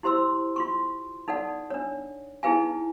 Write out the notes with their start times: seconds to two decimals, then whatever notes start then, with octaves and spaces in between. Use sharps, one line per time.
0.03 E4 G4 C5 C6 E6
0.56 F4 C6 C#6
1.28 D#4 A4 D5 F#5
1.70 D4 C#5
2.43 D#4 E4 G#4 B4 F5 G#5